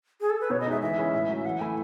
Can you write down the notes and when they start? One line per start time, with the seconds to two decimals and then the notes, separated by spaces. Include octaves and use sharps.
0.21 G#4
0.30 A4
0.41 B4
0.50 B2 C#5
0.60 D#5
0.66 G#3 D#4 E5
0.82 E3 E5
0.98 G#3 C#4 E4
1.14 A2
1.29 F#3 C#4
1.45 E3 F#5
1.60 A3 E4 G#5